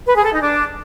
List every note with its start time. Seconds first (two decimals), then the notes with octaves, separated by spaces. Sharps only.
0.06 B4
0.15 G#4
0.24 A4
0.33 D#4
0.42 D4